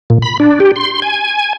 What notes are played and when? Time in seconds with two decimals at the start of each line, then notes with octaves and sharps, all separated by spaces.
0.10 A#2
0.22 B5
0.40 D4
0.60 G4
0.76 C6
1.02 G#5